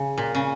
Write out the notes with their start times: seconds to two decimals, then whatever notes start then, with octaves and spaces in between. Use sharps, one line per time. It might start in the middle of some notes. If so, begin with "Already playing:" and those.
Already playing: C#3
0.18 A#2
0.35 C#3